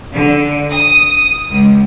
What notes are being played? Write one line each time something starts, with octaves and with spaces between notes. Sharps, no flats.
D3
D#6
C#2